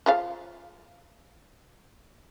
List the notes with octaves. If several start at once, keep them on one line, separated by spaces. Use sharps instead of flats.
F3 F4 F5